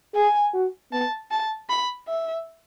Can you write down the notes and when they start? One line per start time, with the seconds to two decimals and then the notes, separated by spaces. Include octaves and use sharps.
0.15 G#4 G#5
0.54 F#4
0.92 B3 A5
1.31 A5
1.70 B5
2.08 E5